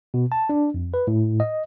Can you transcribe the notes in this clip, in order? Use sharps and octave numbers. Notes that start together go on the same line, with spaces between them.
B2
A5
D4
F2
B4
A2
D#5